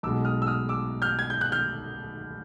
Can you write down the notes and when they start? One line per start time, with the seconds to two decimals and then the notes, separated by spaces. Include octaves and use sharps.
0.03 B1 B2 G#3 D6 E6
0.25 D#6 F6
0.42 E6
0.47 D#6 F6
0.69 D6 E6
1.02 F6 G6
1.19 G#6
1.30 G6
1.41 F#6
1.52 F6 G6